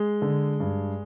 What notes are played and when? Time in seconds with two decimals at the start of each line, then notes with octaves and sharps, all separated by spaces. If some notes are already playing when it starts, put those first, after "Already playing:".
Already playing: G#3 G#4
0.22 D3
0.60 G2